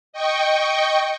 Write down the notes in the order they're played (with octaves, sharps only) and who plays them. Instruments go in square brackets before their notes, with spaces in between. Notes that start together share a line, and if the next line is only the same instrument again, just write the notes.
[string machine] D#5 G5 C#6